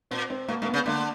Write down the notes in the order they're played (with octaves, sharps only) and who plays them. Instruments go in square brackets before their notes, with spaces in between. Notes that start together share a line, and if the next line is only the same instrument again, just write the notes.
[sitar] A#2 [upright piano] C4
[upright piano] C4
[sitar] B2 [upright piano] A#3
[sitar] B2 [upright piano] A#3
[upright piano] B3
[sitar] C#3
[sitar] D3 [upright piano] A#3